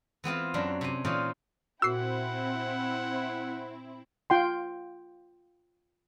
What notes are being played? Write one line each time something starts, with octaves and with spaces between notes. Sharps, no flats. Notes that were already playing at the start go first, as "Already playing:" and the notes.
E3 B3 C4 F4
F#2 F#3 D4 E5 A#5 C6
C3 G#5
A#2 E3 C4 C#4 D#4 F4
A#2 C4 E4 F#4 F#5 E6 C7
F4 G5 C6